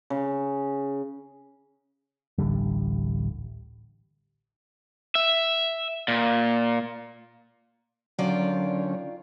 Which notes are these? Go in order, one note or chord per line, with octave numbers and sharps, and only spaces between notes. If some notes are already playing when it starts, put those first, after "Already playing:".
C#3
D1 A1 D3 G3
E5
A#2
D3 D#3 F#3 C#4 F4 D5